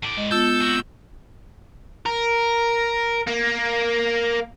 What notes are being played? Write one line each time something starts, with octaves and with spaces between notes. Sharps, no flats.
A2 D5
G#3 D#5
B3 F4 A4 E6 G6
C3 F#4
A#4
A#3